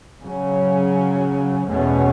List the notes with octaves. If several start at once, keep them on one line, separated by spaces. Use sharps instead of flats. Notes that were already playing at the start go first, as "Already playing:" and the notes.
C#3 F#3 C#4
E2 B2 A3 C#4